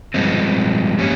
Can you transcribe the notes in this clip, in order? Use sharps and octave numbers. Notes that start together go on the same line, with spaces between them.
G2 F3 G#3 C4
A#3 C#4 G4 C#5